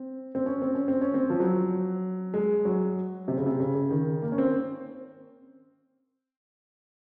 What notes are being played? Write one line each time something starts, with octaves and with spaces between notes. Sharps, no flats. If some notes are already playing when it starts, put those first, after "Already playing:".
Already playing: C4
C4
C#4
C4
C#4
C4
C#4
C4
F3
F#3
G#3
F#3
C3
C#3
C3
C#3
C#3
D#3
A#3
C#4
C4